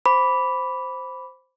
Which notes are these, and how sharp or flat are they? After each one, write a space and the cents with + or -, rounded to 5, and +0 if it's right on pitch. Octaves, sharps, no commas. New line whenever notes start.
C5 +0 B5 +0 D6 -20